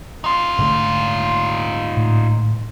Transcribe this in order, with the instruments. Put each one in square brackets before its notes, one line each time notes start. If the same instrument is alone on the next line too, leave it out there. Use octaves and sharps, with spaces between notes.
[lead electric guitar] D#4 F4
[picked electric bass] G#2 D3 A3
[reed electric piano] A2